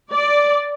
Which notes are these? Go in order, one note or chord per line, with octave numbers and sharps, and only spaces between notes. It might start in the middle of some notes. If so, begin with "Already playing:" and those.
D5